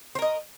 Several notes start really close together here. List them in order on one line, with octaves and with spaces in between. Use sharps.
C5 A#4 D#5